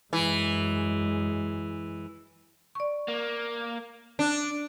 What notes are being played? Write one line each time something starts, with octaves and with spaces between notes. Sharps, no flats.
F#2 E3 G#3
D5 C#6
A#3
D4